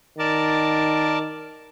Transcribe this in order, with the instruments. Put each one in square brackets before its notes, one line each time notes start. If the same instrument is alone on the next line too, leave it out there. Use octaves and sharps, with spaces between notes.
[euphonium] D#3 [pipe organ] A#4 D5 A5